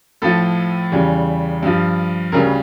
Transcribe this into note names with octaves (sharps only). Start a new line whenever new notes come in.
A2 F3 A4
E2 C#3 G3
G2 F3
D2 C#3 G3 A#4